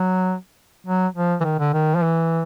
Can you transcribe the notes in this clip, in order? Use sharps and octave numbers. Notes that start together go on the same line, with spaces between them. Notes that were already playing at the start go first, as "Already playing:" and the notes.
Already playing: F#3
F#3
F3
E3
D#3
D3
D#3
F3
E3